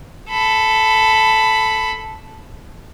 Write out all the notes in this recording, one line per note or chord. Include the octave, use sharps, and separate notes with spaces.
A4 B5